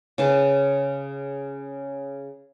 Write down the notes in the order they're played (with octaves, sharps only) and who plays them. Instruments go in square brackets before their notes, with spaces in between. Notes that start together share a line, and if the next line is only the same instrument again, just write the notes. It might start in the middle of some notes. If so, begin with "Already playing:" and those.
[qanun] C#3 B4 A5